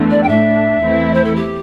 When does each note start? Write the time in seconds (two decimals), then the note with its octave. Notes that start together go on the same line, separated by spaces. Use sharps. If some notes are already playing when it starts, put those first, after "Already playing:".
Already playing: E2 D3 A3
0.10 D5
0.23 G5
0.28 A2 A3 D4 E5
0.82 E2 E3 A3 C4 E4
1.13 C5
1.24 A4
1.35 G4